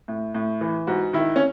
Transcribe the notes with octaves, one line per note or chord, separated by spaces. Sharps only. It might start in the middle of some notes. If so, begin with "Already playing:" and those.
A2
A2
E3
G#2 F#4
D#3 E4
C#4